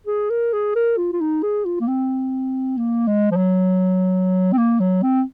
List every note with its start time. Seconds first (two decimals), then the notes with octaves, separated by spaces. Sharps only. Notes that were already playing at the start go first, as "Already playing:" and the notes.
0.07 G#4
0.30 A#4
0.53 G#4
0.76 A#4
0.98 F4
1.13 F4
1.20 D#4
1.43 G#4
1.66 F4
1.81 A#3
1.88 C4
2.77 A#3
3.07 G#3
3.31 F3
3.37 F#3
4.53 C4
4.58 A#3
4.80 F#3
5.03 C4